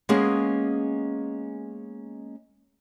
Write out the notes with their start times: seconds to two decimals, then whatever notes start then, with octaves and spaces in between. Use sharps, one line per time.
0.09 G#3 A#3 B3 C#4 G#4